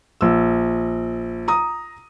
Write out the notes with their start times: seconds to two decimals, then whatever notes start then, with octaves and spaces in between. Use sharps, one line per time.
0.21 A#1 E6
1.48 A#5 D#6